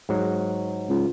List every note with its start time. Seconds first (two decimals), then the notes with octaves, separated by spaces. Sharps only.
0.09 G#2 F#3
0.89 C#2